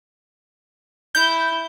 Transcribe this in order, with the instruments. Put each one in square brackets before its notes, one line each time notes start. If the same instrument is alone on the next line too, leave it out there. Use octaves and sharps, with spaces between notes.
[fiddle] E4 [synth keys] G6